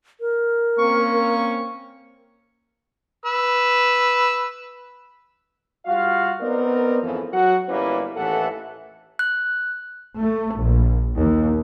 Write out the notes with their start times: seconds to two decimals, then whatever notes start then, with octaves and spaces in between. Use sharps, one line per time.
0.21 A#4
0.79 A#3 C4 C#4 C#6
3.26 B4 E6
5.85 G3 F4 F#4 F5
6.41 B3 C4 D#4 A#4 D5
7.02 F2 G#2 C#3 E3 F3
7.32 F#3 F#4 F#5
7.69 G1 G3 A#3 C#4 E4 B4
8.16 A1 D#2 E3 A4 E5 F#5
9.19 F#6
10.21 A3
10.56 A#1
11.16 D#2